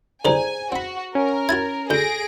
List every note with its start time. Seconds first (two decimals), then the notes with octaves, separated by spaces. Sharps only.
0.25 C2 D3 G#4 C5 G#5 A#5
0.72 C4 F#4 B5
1.15 C#4 A#4
1.49 E4 F#4 G#6 A6
1.90 D2 G#4 A4 G6 A#6 D7